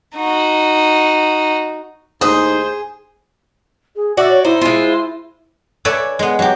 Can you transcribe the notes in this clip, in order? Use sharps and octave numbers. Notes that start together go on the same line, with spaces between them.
D#4 F#4
D#2 A2 D#4 G#4 C5 D#6
G#4
F#4 D5 E5
C#5
D#4 E4 C5
G#3 F4
A4 B4 C#5 D5 E5 G#5
G#3 B3
F#3 G4